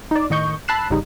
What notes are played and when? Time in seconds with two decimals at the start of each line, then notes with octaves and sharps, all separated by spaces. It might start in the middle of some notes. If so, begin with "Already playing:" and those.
0.11 D#4 D5
0.30 A2 D#3 D#5 C#6 G6
0.68 A5 B5 E6 F#6 C7 E7
0.90 G1 G#2 C#3 G3 D#4